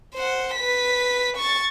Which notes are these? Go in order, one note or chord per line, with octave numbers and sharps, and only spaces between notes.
C5 F#5
B4 B6
C#6 A6